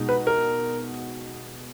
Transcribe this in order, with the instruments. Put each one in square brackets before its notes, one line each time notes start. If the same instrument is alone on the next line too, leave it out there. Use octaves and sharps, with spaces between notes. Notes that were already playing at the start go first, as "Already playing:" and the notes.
Already playing: [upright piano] B2 G#3 D#4 F#4
[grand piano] B4
A#4